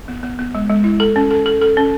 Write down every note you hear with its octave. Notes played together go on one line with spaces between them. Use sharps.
B3
B3
B3
G#3
G#3
E4
A4
C#4
A4
A4
A4
C#4